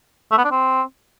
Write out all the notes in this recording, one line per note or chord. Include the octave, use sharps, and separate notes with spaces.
A3
B3
D4
C4